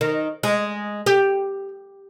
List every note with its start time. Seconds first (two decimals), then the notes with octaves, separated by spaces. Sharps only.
0.01 D#3
0.43 G#3
1.06 G4